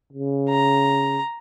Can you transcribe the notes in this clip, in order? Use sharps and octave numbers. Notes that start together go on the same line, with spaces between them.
C#3
A#5